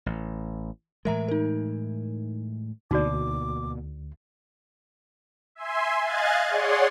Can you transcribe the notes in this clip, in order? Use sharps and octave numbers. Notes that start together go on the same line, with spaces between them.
A1
A2 E3 G#3 A#4 E5 A#5
D#4 A#4
D2 B2 A#3 D#4 F#4 D5 D6
E5 G#5 C6
D#5 F5 G#5 F#6 G#6 A6
G#4 C#5 D5 F#5 C6